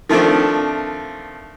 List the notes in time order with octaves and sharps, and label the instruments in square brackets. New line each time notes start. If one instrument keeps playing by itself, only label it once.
[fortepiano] D#3 F3 A3 C4 D4